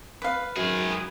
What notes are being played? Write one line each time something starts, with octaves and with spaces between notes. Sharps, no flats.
B4 F5
F#2 D#3 G#4